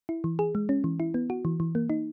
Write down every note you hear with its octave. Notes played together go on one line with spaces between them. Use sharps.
E4
E3
G#4
G#3
C#4
E3
E4
B3
F#4
E3
E3
A#3
D#4